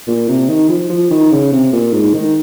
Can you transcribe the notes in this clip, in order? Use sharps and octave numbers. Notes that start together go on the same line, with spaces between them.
A#2
C3
D#3
F3
F3
D#3
C#3
C3
A#2
G#2
D#3